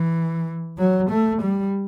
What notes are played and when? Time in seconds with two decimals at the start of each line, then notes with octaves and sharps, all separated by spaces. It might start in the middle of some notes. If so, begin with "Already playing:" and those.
Already playing: E3
0.78 F#3
1.10 A3
1.42 G3